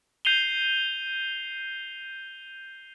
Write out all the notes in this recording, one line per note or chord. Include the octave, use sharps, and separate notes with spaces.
G6 C7 D#7 F7 G7